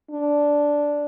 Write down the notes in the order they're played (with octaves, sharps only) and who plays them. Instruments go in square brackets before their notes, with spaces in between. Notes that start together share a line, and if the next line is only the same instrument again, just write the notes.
[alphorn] D4